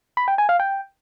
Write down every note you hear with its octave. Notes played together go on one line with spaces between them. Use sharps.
B5
G5
G#5
F5
G5